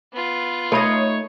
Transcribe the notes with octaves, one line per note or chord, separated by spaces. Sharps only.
B3 F4
A3 D#4 A4 C#5 D#5 B5